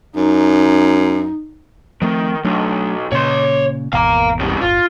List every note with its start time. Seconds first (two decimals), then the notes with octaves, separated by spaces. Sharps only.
0.16 F#2 D#4
2.02 D#3 F3 A3 C4
2.44 B1 F#3 A3 D4
3.12 A#2 C#3 C#5 C6
3.93 G#1 E2 B2 F5 A#5
4.39 C#2 G3
4.61 D1 G1 F4